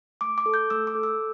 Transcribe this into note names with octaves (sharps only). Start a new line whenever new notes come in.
A3 D6
D6
A4
G6
A3 E6
D6
A4
E6